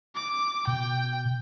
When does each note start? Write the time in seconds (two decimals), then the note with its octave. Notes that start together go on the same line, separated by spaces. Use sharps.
0.15 D6
0.67 B2 G5